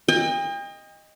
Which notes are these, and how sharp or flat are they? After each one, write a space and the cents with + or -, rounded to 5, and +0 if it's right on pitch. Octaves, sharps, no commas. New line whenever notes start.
D#5 +0 G5 +40